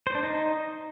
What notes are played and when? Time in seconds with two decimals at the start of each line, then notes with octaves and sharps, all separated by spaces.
0.07 C5
0.15 D4
0.23 D#4